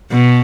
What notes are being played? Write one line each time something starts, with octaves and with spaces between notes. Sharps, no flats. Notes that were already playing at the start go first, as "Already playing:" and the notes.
B2